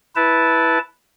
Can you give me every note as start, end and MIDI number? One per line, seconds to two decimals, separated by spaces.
0.16 0.79 64
0.16 0.79 71
0.16 0.79 81